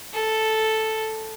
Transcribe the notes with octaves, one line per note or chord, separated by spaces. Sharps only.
A4